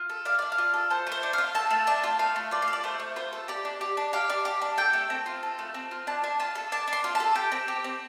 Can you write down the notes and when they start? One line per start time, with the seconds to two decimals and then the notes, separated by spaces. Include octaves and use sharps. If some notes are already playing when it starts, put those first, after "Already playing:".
Already playing: F4
0.09 A4
0.25 D4 F5
0.39 D4 D5
0.52 F5
0.58 F4
0.74 A4
0.90 A4 C5
1.07 A3
1.12 C5
1.23 D4
1.33 F5
1.38 F4
1.55 A4 A5
1.71 A3
1.87 D4 A5
2.04 F4
2.19 A3 F5
2.36 A3
2.51 F4 D5
2.62 F5
2.68 A4
2.73 D5
2.84 A3 C5
3.00 A3
3.16 F4 C5
3.33 A4
3.48 G4 D5
3.65 D4
3.81 G4
3.97 D4
4.13 G4 F5
4.30 D4
4.45 G4
4.62 D4
4.78 A4 G5
4.93 A3
5.10 C4
5.26 F4
5.43 A4
5.59 A3
5.74 C4
5.91 F4
6.07 D4 A5
6.24 D4
6.40 F4 A5
6.55 A4
6.72 D4 A5
6.87 D4
6.93 C6
7.04 F4
7.15 A5
7.20 A4
7.35 G4 G5
7.52 C4
7.68 G4
7.84 C4